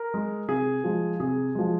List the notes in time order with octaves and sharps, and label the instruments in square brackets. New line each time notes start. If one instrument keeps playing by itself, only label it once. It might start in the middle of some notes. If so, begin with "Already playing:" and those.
Already playing: [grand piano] A#4
G#3
C3 G#4
F3 G#3
C3 G#4
F3 G#3